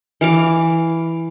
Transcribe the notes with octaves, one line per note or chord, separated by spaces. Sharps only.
E3 F5 D6